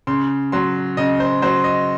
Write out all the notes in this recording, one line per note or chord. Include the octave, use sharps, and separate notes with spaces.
C#3 C6
F#3 C6
C#3 D#5
C5
F#3 C5
D#5